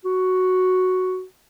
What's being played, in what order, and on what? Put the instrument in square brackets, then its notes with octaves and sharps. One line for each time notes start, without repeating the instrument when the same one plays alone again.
[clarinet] F#4